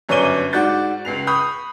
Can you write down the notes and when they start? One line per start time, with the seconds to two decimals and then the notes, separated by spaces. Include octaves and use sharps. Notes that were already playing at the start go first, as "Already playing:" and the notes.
0.09 G1 F#2 C#5 D5 D#7 G7
0.53 G#2 F#4 D5 G6 A6
1.05 C#2 C7 F7
1.27 B5 C#6 D#6 G6